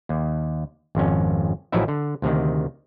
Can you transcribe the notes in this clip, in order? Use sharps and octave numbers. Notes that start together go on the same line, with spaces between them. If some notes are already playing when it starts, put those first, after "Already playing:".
D#2
G#1 F2 C#4
A1 F3 F#3 D#4 E4 E5
D3
D2 C3 D#3